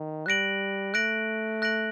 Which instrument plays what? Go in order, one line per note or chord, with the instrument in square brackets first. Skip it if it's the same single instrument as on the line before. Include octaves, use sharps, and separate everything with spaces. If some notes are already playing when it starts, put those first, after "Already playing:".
Already playing: [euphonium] D#3
[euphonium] G3 [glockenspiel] F#6 A#6 D7 F#7
[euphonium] A3 [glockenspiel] F#6 A#6 D7 F#7
[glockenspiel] F#6 A#6 D7 F#7